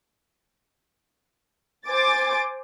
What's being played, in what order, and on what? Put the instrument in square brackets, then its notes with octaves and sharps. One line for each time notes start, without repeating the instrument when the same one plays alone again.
[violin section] C5 G#5 D6 A6